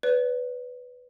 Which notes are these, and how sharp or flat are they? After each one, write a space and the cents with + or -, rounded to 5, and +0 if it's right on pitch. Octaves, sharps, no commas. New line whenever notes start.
B4 +5 D5 -45